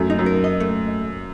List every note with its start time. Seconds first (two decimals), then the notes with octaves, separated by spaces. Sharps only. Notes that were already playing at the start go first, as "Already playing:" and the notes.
Already playing: F#2 A3
0.10 D#4
0.19 F#2
0.26 A#4
0.44 D#5
0.60 A3